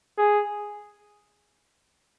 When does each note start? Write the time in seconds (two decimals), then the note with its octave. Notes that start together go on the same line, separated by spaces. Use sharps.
0.18 G#4